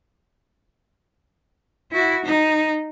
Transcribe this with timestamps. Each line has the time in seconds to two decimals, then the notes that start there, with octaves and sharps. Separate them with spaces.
1.92 E4 F#4
2.25 D#4